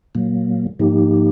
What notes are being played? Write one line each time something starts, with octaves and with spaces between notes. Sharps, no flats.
A#2 F#3 A#3
G#2 F3 A#3 D#4 G4